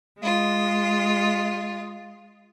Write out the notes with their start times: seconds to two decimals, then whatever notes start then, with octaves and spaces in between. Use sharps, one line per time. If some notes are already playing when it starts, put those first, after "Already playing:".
0.19 G#3 F4